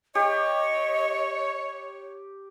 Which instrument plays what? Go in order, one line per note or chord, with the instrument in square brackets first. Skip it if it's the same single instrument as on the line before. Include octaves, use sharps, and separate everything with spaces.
[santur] G4 [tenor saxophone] C#5 [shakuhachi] D#5